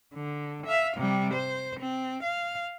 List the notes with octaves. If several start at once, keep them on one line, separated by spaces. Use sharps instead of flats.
D3
E5 F5
C3 G3
C5
C4
F5